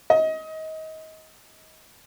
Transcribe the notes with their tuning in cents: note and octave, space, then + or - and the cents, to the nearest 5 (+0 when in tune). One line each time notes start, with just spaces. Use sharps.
D#5 +25